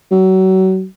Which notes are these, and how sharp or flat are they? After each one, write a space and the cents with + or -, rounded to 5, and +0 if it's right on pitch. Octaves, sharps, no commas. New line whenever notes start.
F#3 +30